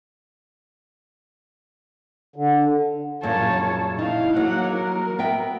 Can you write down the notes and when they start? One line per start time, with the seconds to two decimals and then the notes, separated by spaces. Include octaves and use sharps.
2.36 D3
3.23 F#2 A#2 C#3 C#5 A5
3.99 D#4 E4 F5
4.36 F#3 A#3 F#5
4.73 A#4
5.19 B3 E5 G5